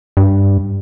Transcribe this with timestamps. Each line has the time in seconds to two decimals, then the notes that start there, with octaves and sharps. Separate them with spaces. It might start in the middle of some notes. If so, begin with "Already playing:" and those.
0.17 G2